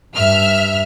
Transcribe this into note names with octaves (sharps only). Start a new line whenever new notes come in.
G2 E5 F6